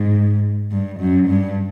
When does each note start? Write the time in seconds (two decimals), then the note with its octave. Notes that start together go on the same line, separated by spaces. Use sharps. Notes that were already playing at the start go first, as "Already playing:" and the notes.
Already playing: G#2
0.72 G2
1.00 F#2
1.28 G2